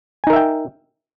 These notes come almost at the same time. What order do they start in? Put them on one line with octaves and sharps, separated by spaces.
G#5 D#4 A#4 E5 G5